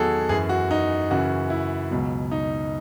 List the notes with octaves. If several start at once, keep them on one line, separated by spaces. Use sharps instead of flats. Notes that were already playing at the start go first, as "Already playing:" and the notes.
Already playing: E2 D#3 F#3 F#4 G#4 A4
F#2 E3 G#4
F#4
D#4
F#2 C#3 E3 F#4
E4
C#2 B2 F#3
D#4